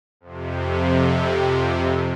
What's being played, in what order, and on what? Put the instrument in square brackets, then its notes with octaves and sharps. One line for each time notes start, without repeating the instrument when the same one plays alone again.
[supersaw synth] F2 C3